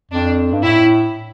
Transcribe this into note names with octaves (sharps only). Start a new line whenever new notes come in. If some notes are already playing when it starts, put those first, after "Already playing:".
F2 D4
G2
A2 E4